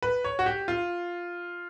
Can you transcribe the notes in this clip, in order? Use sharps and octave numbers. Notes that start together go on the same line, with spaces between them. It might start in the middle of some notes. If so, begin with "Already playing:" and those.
B4
C#5
F#4
G4
F4